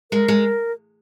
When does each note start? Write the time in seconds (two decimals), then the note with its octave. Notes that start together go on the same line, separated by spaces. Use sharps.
0.12 G#3 A#4
0.28 G#3